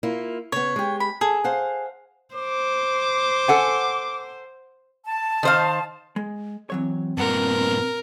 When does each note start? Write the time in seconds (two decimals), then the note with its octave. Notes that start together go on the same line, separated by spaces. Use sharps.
0.03 A#3 E4 F4
0.52 C#3 B3 C#5
0.76 G#3 G4
1.00 B5
1.21 G#4 A4
1.44 C5 F5 F#5
2.35 C5 D6
3.48 A4 F#5 G#5
5.05 A5
5.43 D#3 C5 F5
6.16 G#3
6.70 E3 F#3 C4 C#5
7.18 G2 A#2 B3 A#4 F#5